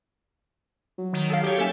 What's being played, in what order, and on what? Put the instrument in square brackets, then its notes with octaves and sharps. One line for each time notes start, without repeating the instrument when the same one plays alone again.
[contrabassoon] F#3
[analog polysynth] D#3
[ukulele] A4 F5
[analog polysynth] G4 C#5
[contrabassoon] F#1 [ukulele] C#4 G#5 [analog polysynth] A4 E5